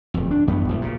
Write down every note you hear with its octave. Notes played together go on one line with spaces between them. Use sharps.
D1 F2
D4
A1 F#2 G3 B3
D#1 A1
A#2 C#3